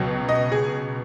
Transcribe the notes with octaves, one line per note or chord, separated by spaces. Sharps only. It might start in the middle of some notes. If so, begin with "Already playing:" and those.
Already playing: C#2 B2 F#3
D#5
G#4